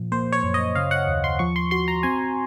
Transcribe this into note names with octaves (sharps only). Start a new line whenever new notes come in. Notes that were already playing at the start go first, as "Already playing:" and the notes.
Already playing: A#2 F3
A#3 C5
C#5
F#2
D#5
C#3 F5
F#5
D#2
C6
F3 C#6
C6
F#4 C6
A#5
C4 G#5